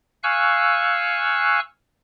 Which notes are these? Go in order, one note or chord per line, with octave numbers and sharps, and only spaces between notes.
F5 G#5 C#6 E6 F#6